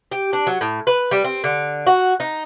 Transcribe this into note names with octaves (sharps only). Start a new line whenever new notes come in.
G4
D4
F#3
A2
B4
G3
C4
D3
F#4
D#4